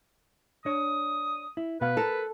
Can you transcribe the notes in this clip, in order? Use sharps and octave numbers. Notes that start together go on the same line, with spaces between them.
D4 C#5 D#6
E4
B2 B3 B4 F5
A4 A#4 A#5